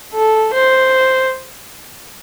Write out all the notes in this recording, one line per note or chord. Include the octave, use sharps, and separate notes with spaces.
A4
C5